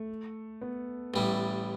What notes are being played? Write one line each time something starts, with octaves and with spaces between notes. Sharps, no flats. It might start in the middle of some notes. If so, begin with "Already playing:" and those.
Already playing: A3
B3
A1 A2 G3